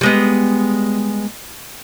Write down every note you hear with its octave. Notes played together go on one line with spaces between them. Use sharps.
G3 G#3 B3